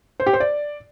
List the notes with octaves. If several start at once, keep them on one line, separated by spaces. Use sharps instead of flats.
C5
G4
C5
D5